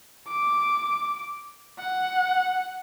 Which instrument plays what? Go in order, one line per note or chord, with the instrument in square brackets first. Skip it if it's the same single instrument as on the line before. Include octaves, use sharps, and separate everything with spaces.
[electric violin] D6
F#5